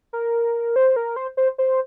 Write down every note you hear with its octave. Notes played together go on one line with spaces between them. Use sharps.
A#4
C5
A#4
C5
C5
C5